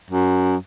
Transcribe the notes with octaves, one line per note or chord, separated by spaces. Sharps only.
F#2